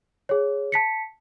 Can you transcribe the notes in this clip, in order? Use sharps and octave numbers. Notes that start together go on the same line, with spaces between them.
G#4 C#5
A5 B6 C#7